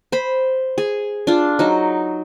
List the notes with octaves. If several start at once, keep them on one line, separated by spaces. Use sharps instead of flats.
C5 B5
G#4
D4 F4
F#3 D#4